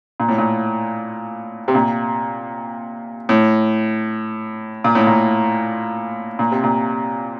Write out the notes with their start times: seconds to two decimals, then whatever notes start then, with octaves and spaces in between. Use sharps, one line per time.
0.20 A#2
0.29 A2
0.38 A#2
1.68 C3
1.75 A#2
3.29 A2
4.84 A#2
4.95 A2
5.07 A#2
6.39 A#2
6.51 C3
6.64 A#2